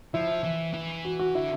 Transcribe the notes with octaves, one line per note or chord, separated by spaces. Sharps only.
F3 E4
E3
E3
F#4
F#4
D3 E4